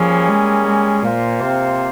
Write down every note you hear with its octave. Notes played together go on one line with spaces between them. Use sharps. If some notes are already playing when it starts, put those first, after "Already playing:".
Already playing: F3 G3 A#3 C#4 G#4
G#3
G#3
A#2 A#3 F4 C5 F5
C3